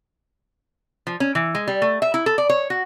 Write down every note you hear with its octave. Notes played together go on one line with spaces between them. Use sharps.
F3
C#4
E3
G#3
G3
A3
E5
E4
A4
D5
C#5
F#4